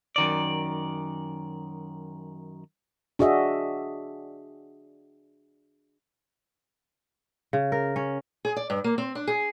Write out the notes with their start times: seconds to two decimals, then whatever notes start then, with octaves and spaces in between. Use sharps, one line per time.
0.16 F#2 D#3 D5
3.19 D4 F#4 G#4 D#5 E5
7.53 C#3
7.72 A#4
7.96 C#4
8.45 G#4
8.56 D5
8.70 G2
8.84 A#3
8.98 C4
9.15 D4
9.27 G#4